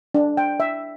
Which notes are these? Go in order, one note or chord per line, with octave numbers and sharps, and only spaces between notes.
D4
G5
E5